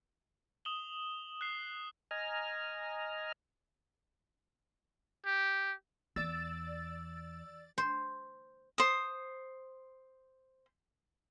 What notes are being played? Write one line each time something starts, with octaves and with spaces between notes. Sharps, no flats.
D#6 E7 F#7 G7
F#6 C7
D#5 G#5 A#5 F6
G4
E2 D5 E6 A6
C5
C5 D#6